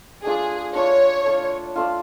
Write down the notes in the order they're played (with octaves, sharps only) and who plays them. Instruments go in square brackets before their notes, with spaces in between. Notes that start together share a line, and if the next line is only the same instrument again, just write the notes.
[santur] A3 D4 F4 [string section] G#4
[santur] A3 D4 F4 [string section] C#5
[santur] A3 D4 F4
A3 D4 F4